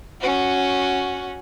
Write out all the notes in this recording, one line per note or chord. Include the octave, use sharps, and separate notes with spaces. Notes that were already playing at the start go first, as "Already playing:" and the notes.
C#4 F#4